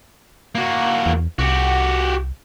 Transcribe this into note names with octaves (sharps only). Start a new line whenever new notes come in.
A#3 F#4
E2
C2 F#4 G4